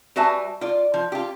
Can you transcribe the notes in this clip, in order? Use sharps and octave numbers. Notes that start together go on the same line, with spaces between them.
G3 F#4 B4 E5 G#5 A5
F4 D5
F3
F4 G4